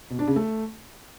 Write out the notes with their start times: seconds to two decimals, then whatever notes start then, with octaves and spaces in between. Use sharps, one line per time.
0.10 B2
0.19 D4
0.27 C#3
0.36 A3